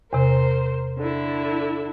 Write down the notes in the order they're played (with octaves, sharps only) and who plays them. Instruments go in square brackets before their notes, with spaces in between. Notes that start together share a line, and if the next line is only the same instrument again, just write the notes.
[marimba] E2 C3 [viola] A#4 C5
[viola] D3 E4